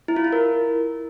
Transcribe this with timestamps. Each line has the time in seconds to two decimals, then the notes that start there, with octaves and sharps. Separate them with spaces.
0.08 E4
0.16 F4
0.24 E4
0.33 A#4